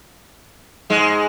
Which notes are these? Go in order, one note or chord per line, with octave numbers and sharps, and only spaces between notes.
G#2 G#3